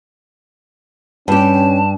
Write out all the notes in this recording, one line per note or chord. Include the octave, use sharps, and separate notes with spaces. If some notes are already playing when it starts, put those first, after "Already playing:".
G2 C#4 G4 A5